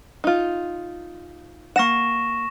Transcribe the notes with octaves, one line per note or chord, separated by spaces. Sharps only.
D#4 F4
A#3 F#5 C#6 A#6 E7